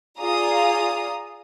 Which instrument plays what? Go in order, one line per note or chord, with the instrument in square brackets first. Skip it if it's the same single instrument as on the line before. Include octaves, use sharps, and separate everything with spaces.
[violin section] F4 G#4 D5 F5 A#5 D#6